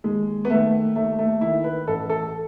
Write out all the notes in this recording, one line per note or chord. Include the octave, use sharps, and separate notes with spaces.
D#2 G#3
B3
D#3 A3
D#2 A3
A3
D#3 E4
B4
A1 A4
A4